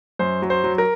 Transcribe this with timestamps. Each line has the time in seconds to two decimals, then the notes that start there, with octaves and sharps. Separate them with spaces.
0.19 F#2 C5
0.42 F#3
0.50 C5
0.64 F#3
0.78 A#4